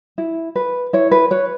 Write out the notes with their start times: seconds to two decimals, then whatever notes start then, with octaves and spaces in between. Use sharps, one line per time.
0.18 E4
0.56 B4
0.93 E4 C#5
1.11 B4
1.31 B4 C#5